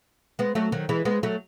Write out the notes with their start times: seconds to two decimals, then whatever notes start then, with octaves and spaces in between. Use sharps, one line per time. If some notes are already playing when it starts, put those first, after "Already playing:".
0.39 G#3 B3
0.55 F#3 A3
0.72 D#3 F#3
0.89 E3 G#3
1.05 G#3 B3
1.23 F#3 A3